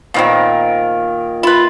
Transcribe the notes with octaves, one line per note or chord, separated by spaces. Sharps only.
A#2 D#3 F3 B3 C4 A#4
E4 F4 B4